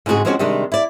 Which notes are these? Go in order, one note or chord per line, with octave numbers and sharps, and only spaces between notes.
G#2 C#3 C4 C#4 F#4 G#4
F3 G#3 C4 C#4 D#4 F#4
C3 D#3 G3 G#3 D4
E4 D5